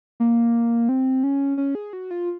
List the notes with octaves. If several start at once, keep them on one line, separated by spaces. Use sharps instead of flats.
A#3
C4
C#4
C#4
G#4
F#4
F4